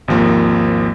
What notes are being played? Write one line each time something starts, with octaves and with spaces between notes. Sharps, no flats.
G#1 D#2 F3 A#3